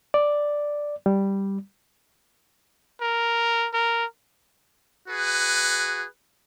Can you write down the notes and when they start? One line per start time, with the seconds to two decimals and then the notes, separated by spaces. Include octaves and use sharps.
0.14 D5
1.06 G3
3.01 A#4
3.73 A#4
5.08 F#4 G#4 B4